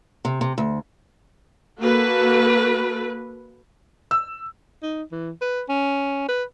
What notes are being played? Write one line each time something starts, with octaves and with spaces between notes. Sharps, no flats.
C3
C3
D2
A#3 F#4 A4 B4
E6
D#4
E3
B4
C#4
B4